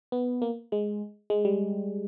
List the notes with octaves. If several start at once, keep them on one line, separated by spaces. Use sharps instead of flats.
B3
A#3
G#3
G#3
G3